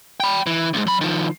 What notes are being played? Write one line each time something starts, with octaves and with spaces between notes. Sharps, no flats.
G5 B5
E3
D2 G#2
F#3 B5
D#3 F3